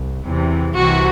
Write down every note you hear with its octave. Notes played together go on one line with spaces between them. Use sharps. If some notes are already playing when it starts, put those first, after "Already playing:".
Already playing: C2
E2 C3 E3
C2 C3 E3 F#4